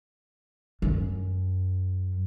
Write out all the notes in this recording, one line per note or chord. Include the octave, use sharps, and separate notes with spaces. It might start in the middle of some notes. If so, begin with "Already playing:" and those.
F#2